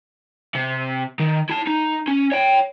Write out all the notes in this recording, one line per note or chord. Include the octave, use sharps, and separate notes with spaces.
C3
D#3
E4 A5
D#4
C#4
C#5 G5